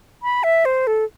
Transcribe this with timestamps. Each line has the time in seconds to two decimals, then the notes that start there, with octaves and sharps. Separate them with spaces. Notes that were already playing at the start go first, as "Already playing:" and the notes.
0.23 B5
0.44 E5
0.65 C5
0.87 A4